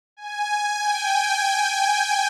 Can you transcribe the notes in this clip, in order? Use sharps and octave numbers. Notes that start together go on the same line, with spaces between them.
G#5
G5